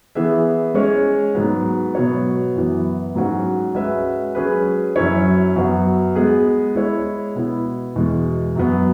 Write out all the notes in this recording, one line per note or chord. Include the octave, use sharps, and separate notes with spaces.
E3 B3 G#4 E5
G#3 C#4 G#4 C#5
G#2 F#3 B3
B2 F#3 B3 F#4 C#5
F#2 E3 B3
G#2 F#3 C#4 F#4
G#3 C#4 F#4 B4 E5
F#3 C#4 G#4 B4
F#2 F#3 C#4 E4 C#5
F#2 F#3 B3 F#4
G#3 B3 G#4 B4
G#3 E4 G#4 C#5
B2 B3 E4
E2 B2 G#3
F#2 F#3 B3